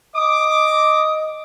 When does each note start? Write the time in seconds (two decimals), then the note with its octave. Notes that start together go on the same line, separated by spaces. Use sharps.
0.16 D#5 D6 D#6